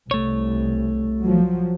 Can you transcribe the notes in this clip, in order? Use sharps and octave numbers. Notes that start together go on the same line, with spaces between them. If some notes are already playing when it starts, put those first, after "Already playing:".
C2 A3 C#5
F3 F#3